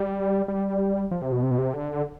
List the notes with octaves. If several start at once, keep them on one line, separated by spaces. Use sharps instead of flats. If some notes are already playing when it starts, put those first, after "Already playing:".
Already playing: G3
G3
F3
C3
B2
C3
B2
C3
D3